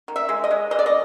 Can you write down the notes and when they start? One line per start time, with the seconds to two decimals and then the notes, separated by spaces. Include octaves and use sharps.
0.08 D#3
0.16 E5
0.29 G#3
0.44 D#5
0.51 G#3
0.71 E3 D#5
0.79 D5
0.86 D#5